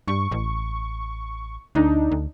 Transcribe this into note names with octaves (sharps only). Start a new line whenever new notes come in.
G2 C#6
A1
D2 D4 D#4
D2